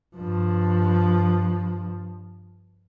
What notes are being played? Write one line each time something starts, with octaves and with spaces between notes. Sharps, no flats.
G2 F3